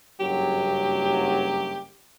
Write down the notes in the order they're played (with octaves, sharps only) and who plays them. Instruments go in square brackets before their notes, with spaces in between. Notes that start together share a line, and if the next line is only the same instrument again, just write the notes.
[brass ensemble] F#1 G2 F#3 [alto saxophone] G4